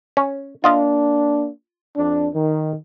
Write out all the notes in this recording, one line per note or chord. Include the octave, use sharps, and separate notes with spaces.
C#4
A#3 D4 F4 D#5 F5
F2 D4
D#3